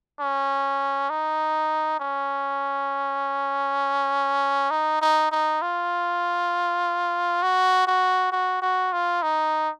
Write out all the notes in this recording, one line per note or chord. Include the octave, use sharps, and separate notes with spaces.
C#4
D#4
C#4
D#4
D#4
D#4
F4
F#4
F#4
F#4
F#4
F4
D#4